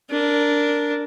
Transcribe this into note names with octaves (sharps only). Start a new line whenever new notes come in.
D4 A#4